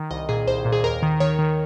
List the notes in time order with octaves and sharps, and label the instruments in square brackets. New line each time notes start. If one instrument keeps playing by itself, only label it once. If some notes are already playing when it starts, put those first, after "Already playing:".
Already playing: [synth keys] D#3
C2 D#5
A#2 G#4
C2 C5
A#2
G#4
D#2 A#4
D#3
D#3 C#5
D#3